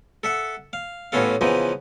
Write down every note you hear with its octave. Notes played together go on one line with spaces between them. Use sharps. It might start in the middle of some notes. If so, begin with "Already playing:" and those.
A4 E5 F#5
F5
A1 A2 B3 C#4 A4 F5
C#3 E3 F3 B3 D#4